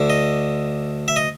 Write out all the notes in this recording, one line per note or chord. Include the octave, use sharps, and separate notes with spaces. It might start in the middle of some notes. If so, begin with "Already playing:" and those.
Already playing: D2 D3
D#5
E5
D#5